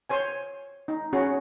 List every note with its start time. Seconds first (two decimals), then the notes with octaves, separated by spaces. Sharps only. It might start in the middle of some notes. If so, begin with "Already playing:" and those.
0.09 C5 C#5 G#5
0.88 D#4
1.13 C#4 F#4 G#4